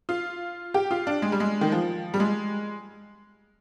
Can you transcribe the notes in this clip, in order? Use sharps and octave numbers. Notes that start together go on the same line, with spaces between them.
F4
G4
F4
D4
G#3
G3
G#3
D#3
F3
G3
G#3